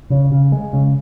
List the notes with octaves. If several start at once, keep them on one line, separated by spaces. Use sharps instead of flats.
C#3
C#3
G#3
C#3